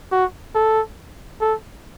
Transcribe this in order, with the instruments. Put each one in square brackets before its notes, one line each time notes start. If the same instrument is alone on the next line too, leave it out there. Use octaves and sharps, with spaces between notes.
[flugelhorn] F#4
A4
A4